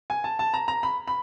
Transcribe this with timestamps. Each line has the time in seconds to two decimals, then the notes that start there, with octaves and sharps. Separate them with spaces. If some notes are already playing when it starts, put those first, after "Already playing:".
0.10 G#5
0.24 A5
0.39 A5
0.54 A#5
0.68 A#5
0.83 B5
1.08 B5